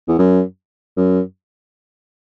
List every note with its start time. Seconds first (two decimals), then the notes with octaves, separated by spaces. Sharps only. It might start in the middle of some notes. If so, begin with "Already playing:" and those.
0.08 E2
0.18 F#2
0.97 F#2